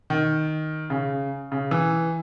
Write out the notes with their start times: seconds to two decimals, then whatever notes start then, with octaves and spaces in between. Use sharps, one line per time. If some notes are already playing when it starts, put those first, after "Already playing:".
0.10 D#3
0.90 C#3
1.52 C#3
1.71 E3